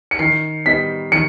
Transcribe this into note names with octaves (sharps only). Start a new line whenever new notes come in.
C#7
D#3 C7
G3 B3 D#4 B6
D#3 C#7